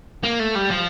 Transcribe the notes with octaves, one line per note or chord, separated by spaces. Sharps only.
A#3
A3
G3
F3